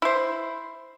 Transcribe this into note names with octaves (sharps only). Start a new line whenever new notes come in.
E4 C5